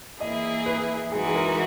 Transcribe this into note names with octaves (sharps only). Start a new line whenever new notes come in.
E3 A#3 E4 G#4 D#5
B4
E3 G#3 D#4 F#4 G#4
G#4
A#4